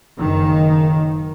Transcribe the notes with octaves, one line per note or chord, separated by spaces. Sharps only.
F#1 D#3